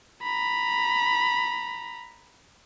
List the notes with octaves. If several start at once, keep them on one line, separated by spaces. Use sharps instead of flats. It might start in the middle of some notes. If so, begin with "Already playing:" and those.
A#5 B5